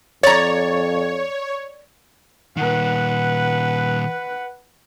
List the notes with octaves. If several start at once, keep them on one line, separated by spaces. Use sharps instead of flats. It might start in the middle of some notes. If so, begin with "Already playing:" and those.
F2 C#5 D5 A#5
A#2 D#3 B4 F#5